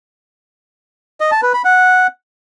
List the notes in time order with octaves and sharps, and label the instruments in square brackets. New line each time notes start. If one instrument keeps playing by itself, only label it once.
[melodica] D#5
A5
B4
B5
F#5